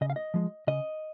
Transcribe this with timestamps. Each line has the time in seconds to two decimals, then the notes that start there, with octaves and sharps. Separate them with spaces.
0.01 C#3 D#5
0.10 F5
0.16 D#5
0.34 F3 G#3
0.67 C#3 D#5